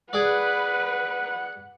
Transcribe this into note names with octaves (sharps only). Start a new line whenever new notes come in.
G#4 B4 D5 F#5